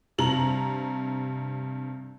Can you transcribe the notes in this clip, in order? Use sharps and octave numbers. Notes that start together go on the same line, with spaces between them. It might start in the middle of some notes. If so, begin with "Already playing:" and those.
G2 C3 A#5 F#7